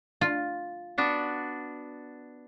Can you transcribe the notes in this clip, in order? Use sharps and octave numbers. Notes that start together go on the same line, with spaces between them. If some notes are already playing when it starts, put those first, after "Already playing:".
F4
B3 D4 F#4